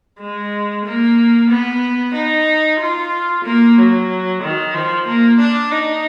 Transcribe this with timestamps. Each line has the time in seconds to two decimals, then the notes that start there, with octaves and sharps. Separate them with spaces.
0.20 G#3
0.85 A#3
1.50 B3
2.14 D#4
2.79 F4
3.44 A#3
3.77 F#3
4.42 D#3
4.74 F3
5.07 A#3
5.40 D4
5.71 D#4